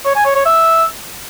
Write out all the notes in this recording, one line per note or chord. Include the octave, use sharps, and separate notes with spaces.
C#5
G#5
C#5
C#5
E5